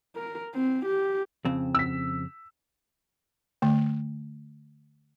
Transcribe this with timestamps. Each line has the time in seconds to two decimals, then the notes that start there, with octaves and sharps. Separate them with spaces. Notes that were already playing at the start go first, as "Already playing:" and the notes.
0.16 A#4
0.55 C4
0.86 G4
1.45 F2 C#3 C4
1.75 E6 B6
3.62 D3 A3